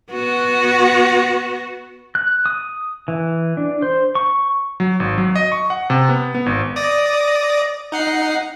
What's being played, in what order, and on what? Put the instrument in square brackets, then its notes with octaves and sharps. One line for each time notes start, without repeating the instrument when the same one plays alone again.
[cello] B3 F#4
[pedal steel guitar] F#6
D#6
E3
D4
C5
C#6
[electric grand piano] F#3
G#1
F#3
D#5
C#6
F#5
C3
B3
B3
G#1
[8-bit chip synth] D5 D#6 A#6
D#4 F#5 C7